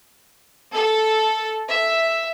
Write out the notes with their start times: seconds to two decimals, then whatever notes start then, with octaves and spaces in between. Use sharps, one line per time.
0.73 A4
1.67 E5